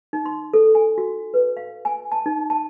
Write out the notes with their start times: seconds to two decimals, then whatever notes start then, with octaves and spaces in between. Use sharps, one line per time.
0.13 D#4
0.26 C6
0.54 A4
0.75 G#5
0.98 F#4
1.34 B4
1.57 F5
1.85 G#5
2.12 A5
2.26 D#4
2.50 A5